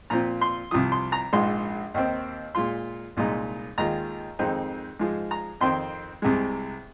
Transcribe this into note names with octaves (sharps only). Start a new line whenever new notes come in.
A#2 F3 C4 F4 A#5
C6
C2 C3 F3 D#6
C6
A#5
A#1 G#2 G#3 F4 C6
D#2 D#3 C4
A#2 G#3 F4 C6
C2 A#2 G#3 D#4
D#2 D#3 G#3 F4 A#5
F2 D#3 G#3 C4 D#4
G#2 F3 G#3
A#5
F2 D#3 C4 C6
C2 C3 G#3